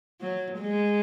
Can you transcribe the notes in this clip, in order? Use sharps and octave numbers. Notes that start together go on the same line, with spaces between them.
F#3
G#3